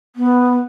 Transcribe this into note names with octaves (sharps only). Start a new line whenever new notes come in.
B3